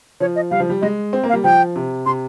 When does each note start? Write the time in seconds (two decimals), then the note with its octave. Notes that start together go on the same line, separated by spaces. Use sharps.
0.20 F3 C#5
0.36 D#5
0.51 G3 F5
0.60 F3
0.70 G3
0.82 G#3 D#5
1.13 C4
1.23 A#3
1.29 F5
1.33 G3
1.44 F3 G5
1.76 C3
2.06 C3 C6